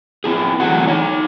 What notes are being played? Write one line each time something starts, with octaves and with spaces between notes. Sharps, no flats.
C4 E4 G#4
E3 F#3 A3 E4 F#4 F#5
D#4 C#5